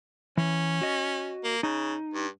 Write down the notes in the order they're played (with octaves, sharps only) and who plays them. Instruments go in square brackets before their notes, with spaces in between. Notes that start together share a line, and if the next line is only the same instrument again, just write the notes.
[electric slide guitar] E3 [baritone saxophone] C#4
[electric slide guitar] F#4 D#5
[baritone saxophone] A#3
[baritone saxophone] C#3 [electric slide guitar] D#4
[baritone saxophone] G2